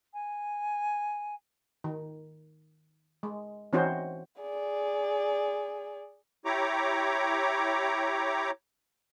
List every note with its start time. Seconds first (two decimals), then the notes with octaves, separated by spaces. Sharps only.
0.13 G#5
1.84 D#3
3.23 G#3
3.73 E3 C4 C#4 D#4 F#4 C5
4.42 G#4 D5
6.45 E4 G4 C#5 A#5 D6